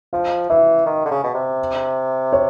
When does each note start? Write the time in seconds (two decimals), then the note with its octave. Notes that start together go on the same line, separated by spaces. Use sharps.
0.13 F3 F5
0.50 E3 E5
0.86 D#3
1.05 D3
1.11 C#3
1.24 B2
1.34 C3
2.33 C#5